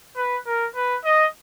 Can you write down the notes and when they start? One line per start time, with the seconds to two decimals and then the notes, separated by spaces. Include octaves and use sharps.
0.16 B4
0.46 A#4
0.76 B4
1.05 D#5